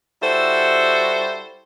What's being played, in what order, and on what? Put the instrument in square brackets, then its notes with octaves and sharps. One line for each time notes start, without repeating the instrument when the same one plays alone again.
[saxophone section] G3 E4 F#4 A4 C5